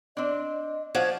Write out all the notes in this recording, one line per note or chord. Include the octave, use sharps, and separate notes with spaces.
C4 D4 D#5
F3 C#5 D5 F5 F#5